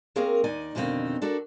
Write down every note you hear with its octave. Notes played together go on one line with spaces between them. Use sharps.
A#3 C4 G#4 A#4 C#5 F5
D#2 D#4 D5 G#5
F2 B2 D3 D#3 C4 F5
D4 F#4 A4 A#4